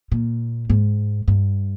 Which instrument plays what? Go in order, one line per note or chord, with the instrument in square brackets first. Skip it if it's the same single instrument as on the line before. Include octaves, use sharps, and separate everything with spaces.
[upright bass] A#2
G#2
G2